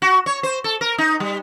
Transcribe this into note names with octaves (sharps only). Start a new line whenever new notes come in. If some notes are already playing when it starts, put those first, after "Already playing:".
F#4
C#5
C5
A4
A#4
D#4
G3